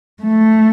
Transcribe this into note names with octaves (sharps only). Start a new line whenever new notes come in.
A3